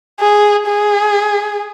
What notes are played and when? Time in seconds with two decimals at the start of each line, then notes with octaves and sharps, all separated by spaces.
0.20 G#4
0.68 G#4